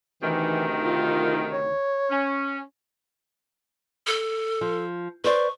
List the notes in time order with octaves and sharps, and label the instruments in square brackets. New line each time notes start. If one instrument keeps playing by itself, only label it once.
[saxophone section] D2 C3 D#3 [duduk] E3
[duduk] F4
C#5
[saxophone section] C#4
[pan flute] A4
[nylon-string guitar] F3
[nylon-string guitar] B4 C5 D5 [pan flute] C#6